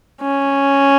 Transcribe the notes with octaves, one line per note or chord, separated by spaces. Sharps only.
C#4